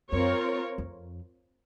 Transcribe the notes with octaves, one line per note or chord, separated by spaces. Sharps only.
F#2 C4 F4 A#4 C#5
F2